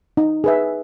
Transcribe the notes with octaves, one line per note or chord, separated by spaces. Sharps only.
D#4
G#4 B4 E5